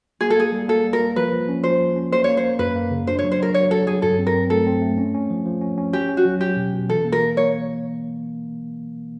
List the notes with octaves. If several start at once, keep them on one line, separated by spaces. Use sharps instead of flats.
A#3 G#4
A4
A#3 G#4
G3
A#3 A4
G3
A#4
A#3
F3 B4
F3
C#4
F3 C5
F3
C#4
A#3 C5
A#3 C#5
C5
A#3
F#2 B4
A#3
C#3
D4 C5
C#5
F#3
C5
F#3 A#4
F#3 C#5
F#3 A4
F#3 G#4
G2 A4
C4
A#4
C4
A3 A4
C4
A3
C#4
C#4
F3
F3
C#4
C#4
C#4 G4
C#4
F#4
F#3
F#3 G4
B2
B2
E3 A4
A#3
A#4
A#3
A#3 C#5